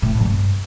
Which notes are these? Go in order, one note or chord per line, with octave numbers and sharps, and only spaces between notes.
A2
F2
G2